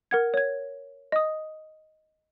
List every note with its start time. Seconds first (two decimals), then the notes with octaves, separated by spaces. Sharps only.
0.11 A#4 F#5 G#6
0.34 C#5 G#6
1.12 D#5 D#6